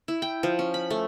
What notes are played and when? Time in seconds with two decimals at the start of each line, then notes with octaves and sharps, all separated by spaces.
0.08 E4
0.22 G5
0.43 F3
0.59 C#4
0.74 B5
0.91 A3